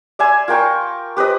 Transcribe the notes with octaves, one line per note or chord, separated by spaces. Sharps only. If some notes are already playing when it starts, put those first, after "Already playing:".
D5 E5 G#5 C6
F4 A#4 G5 C#6
G4 B4 C5 D#5